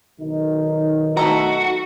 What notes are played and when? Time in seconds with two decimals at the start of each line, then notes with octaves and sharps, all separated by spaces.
0.20 B1 D#3 D#4
1.17 A3 F#4 A4 A#5